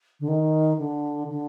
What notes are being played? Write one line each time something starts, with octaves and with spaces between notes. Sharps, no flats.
D3
D#3
D3
D3